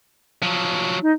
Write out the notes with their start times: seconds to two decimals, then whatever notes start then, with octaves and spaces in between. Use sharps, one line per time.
0.43 F3 F#3
1.02 D#4